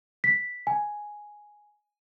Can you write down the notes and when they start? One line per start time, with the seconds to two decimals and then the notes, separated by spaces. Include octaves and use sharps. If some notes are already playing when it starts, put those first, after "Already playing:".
0.24 B6
0.67 G#5